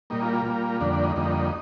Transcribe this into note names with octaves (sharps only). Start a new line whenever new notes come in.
A#2 G3 A#3 D#4
F4
F4
A#2 G3 A#3 F4
F2 D3 G3 A#3 D4
D4
D#4
F2 D3 G3 A#3 D#4